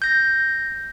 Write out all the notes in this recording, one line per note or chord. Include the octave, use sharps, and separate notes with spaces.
G6 A#6